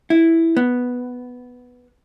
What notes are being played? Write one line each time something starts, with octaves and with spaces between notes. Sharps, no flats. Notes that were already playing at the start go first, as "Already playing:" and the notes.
E4
B3